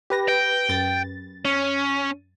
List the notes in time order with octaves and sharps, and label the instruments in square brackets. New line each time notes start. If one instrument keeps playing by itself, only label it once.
[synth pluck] G4 B4 A#6
[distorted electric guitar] G5
[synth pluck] F#2 A6
[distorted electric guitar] C#4